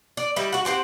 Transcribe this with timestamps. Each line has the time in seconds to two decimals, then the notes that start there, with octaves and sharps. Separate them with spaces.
0.17 D5
0.36 G3 D#4 E4 G4
0.53 F#4 F#5
0.65 C4 G4 C5 F#5